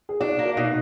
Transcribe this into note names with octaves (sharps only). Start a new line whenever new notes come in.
G#4
D4 D#4 F#4
A#3
F#4 A#4
B2 D#4 F#4